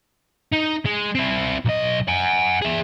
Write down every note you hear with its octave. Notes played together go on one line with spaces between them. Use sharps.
D#4
G#3
C4 E4
B1 D#5
F#5 G#5
G#4 E5